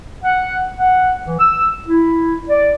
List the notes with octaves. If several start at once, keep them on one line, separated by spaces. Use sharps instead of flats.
F#5
F#5
E3
E6
E4
D5